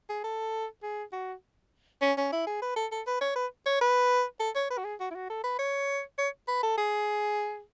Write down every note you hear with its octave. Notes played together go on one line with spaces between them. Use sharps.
G#4
A4
G#4
F#4
C#4
C#4
E4
G#4
B4
A4
A4
B4
C#5
B4
C#5
B4
A4
C#5
B4
F#4
G#4
F#4
E4
F#4
A4
B4
C#5
C#5
B4
A4
G#4